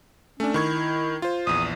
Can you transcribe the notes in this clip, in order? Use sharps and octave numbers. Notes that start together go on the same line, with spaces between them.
A3 C#4 D4
D#3 E4 C#6 G#6
F4 C5
A#1 E2 D#6